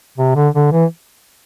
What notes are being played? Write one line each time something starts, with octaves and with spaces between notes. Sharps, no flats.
C3
D3
D3
E3